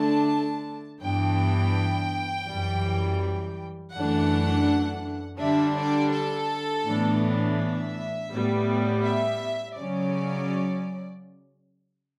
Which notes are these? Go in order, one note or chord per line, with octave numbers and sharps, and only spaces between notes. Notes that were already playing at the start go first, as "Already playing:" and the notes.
Already playing: D3 A3 D4 A5
G2 E3 B3 D4 G5
F#2 E3 G3
F#2 E3 A3 D4 F#5
D3 G3 D4 E5
D5
A4
A2 E3 B3 D4
E5
A2 G3 B3
E5
C#3 F#3 C#4 D5